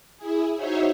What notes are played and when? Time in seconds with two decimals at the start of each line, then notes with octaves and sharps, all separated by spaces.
0.17 E4 G#4
0.57 D#4 F#4 C5 C#5 E5